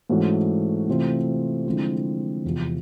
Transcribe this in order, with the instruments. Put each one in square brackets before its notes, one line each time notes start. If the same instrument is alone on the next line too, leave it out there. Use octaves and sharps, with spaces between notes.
[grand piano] G#2 E3 A3 C#4 F#4
C3 E3 A3 C4 F4
D3 F3 G#3 C4 E4
E2 C3 F3